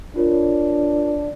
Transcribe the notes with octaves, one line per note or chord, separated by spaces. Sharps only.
D4 F4 A#4 C#5